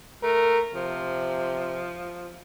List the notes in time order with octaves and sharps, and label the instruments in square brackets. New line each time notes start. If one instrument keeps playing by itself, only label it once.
[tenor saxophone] A3 [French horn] A#4
[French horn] C3 [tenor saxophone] F3